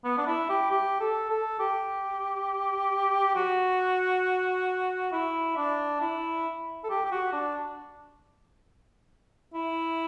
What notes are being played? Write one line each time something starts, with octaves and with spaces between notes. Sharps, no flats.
B3
D4
E4
G4
G4
A4
A4
G4
F#4
E4
D4
E4
A4
G4
G4
F#4
D4
E4